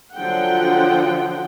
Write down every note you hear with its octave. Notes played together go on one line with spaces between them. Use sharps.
D3 F3 F#3 F#5 G5